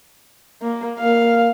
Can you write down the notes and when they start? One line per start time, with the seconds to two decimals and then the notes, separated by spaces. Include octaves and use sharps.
0.62 A#3
0.99 A#3 F5